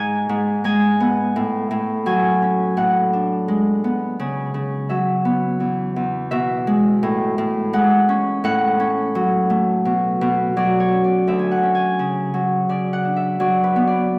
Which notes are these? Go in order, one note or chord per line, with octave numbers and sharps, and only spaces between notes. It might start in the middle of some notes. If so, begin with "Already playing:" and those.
Already playing: G#2 G#5
G#2
G#3 G#5
B3
A2
A2
F#3 G#5
C#4
A2 F#5
D4
G#3
B3
C#3
C#3
F#3 E5
B3
E2
E2
B2 E5
G#3
A2
A2
G#3 F#5
C#4
A2 F#5
C#4
F#3
A3
B2
B2
F#3 D5
C#5
C#4
D5
D2 E5
G#5
F#5
C#4
G#5
C#3
F#3
C#3 D5
F#5
D4
E5
F#3 D5
B4
B3
D5